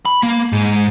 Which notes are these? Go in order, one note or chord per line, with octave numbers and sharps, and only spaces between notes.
B5
A#3
G#2